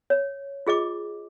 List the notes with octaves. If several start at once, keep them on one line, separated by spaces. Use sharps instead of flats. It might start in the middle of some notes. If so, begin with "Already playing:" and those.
C#5
F4 G#4 D#5 D6